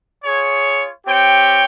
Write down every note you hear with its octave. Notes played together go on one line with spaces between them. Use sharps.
F4 G#4 C#5
C4 G4 C#5 G5